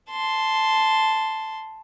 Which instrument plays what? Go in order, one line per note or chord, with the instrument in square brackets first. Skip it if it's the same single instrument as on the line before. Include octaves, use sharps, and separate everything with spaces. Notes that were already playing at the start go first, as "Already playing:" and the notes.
[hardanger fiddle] A5 C6